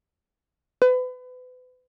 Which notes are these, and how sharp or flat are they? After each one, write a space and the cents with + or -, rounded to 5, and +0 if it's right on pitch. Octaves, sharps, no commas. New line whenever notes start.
B4 +35